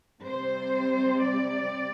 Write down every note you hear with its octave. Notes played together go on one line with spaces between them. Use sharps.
C3 G3 C4 C5
D5